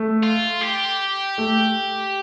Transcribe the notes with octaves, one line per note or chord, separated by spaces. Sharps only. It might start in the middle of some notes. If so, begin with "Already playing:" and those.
Already playing: A3
F4
G4
A3